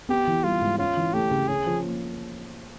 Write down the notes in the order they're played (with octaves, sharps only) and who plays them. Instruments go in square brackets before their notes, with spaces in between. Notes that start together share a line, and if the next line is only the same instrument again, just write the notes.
[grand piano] B3 [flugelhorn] G4
[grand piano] E3
[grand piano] G3 [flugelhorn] F4
[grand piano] G#2
[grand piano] C#4 [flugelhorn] F4
[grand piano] E3
[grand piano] A3 [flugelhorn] G4
[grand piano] C#3
[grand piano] C#4 [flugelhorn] G#4
[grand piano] F3
A#3